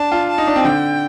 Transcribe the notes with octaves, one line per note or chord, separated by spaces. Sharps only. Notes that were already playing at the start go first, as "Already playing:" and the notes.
Already playing: D4 A5
F4
A5
D#4
D4
C4
D3 G5